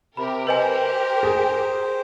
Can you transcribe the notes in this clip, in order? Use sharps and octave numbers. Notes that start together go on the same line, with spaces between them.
C3 G4 A#4 B5
B4 C5 D#5 G#5
G#4